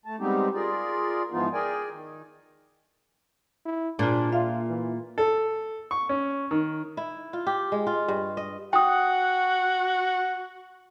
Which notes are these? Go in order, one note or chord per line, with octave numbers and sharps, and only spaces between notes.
A3 A5
G3 G#3 B3 C4 D#4 G4
F4 G#4 A#4 D5
G#2 E3 F3 B3 D#4 F4
G#4 A#4 D5 G5 G#5
D#3
E4
A#2 D4 F4 G#4
F4 E5 F5
E3
A4
C#6
C#4
D#3
E4
F4
G4
G#3
F4
G2
D#5
F#4 F#5 G5 D#6